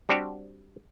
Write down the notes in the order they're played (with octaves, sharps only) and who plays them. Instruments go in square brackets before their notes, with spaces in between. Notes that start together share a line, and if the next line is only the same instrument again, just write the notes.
[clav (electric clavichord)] G3 C4 D4 F#4 G4